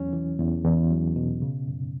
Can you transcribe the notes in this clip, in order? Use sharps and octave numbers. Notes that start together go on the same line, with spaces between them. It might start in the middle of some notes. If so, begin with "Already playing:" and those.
Already playing: E2 F#3 C#4
E3
E2
E2
F#3
B2
C#3
F#2